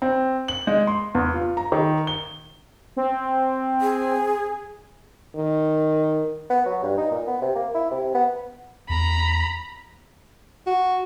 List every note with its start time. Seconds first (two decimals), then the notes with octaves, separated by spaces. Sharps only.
0.02 C4
0.48 F#7
0.67 G#3
0.87 C6
1.15 E2
1.34 F4
1.57 A#5
1.72 D#3
2.07 G7
2.97 C4
3.81 G#4
5.35 D#3
6.50 B3
6.66 F#3
6.83 G2
6.97 D#4
7.11 A#2
7.27 B3
7.41 C3
7.55 A#3
7.74 E4
7.91 C3
8.15 B3
8.89 E2 A#5 B5
10.67 F#4